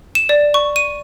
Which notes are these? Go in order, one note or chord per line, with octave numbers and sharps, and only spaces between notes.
E7
D5
C#6
D#7